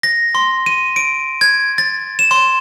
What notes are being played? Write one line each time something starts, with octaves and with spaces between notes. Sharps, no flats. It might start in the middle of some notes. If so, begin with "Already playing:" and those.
A#6
C6
D#7
D7
G#6
A6
E7
C6